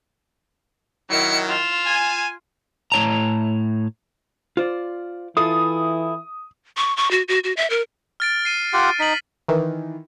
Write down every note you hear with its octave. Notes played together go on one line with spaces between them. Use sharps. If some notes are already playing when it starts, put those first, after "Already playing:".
D#3 F#3 E4 C#7
F4 E7
G#5
A2 E4 C#5 A5 A#5
F4 C5 D5
E3 E4 F4 A4 D#6
C#6
C#6
F#4
F#4
F#4
E5
A#4
F6 A6 D7
C7 D#7
F4 G4 F#5
D#4 B6 F#7
D#3 E3